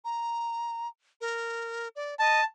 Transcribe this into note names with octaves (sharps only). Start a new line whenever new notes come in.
A#5
A#4
D5
D#5 A5